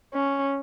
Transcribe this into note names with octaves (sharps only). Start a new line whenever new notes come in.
C#4